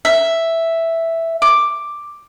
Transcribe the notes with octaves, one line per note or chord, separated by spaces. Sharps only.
E5
D6